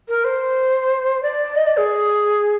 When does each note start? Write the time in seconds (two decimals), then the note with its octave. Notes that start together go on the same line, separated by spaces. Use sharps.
0.08 A#4
0.24 C5
1.23 D5
1.56 D#5
1.67 D5
1.77 G#4